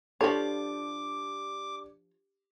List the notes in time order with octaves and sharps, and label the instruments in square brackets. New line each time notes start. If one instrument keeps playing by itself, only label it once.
[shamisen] F3 C#5 [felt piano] D4 G4 [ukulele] F4 A4 [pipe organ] D6